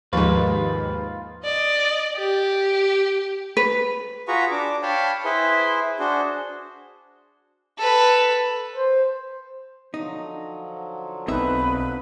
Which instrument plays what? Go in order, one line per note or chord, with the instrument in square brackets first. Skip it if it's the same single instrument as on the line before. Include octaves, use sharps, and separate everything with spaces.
[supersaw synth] D#2 G#2 [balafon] F3 [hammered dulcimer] F4 [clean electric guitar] B4
[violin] D5 D#5
G4
[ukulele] B4
[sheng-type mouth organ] F4 F#4 G#4 B4 A#5 C#6
D4 D6
C#5 F5 G5 A5 B5
E4 G#4 B4 C5
D4 F#4 G#4 C5
[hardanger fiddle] A4 B4
[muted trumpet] C5
[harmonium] D3 F3 F#3 [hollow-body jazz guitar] D#4
[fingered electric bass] B1 C4 [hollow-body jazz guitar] D#4 E5 [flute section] B4